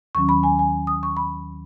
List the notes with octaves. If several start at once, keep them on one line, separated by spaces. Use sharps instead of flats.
D#2 D#3 F#3 C#4 C#6
B5
G#5
G#5
D#6
C#6
B5